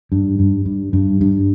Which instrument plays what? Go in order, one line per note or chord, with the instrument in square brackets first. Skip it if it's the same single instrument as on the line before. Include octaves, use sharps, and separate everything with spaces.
[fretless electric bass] G2
G2
G2
G2
G2